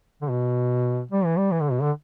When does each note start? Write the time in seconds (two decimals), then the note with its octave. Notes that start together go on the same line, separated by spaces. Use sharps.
0.22 D3
0.30 B2
1.11 G3
1.25 E3
1.38 G3
1.52 E3
1.62 D3
1.72 B2
1.82 D3